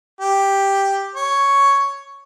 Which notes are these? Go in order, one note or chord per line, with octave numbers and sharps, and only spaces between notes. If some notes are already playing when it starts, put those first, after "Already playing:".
G4
C#5